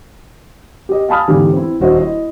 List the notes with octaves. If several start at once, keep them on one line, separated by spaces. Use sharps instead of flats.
G4 D#5
F5 G#5 A5 B5 D#6 F6
E2 G#2 D3 G4
C4 E4
D#1 D4 F#4 C5 D#5 E5
E4 D#5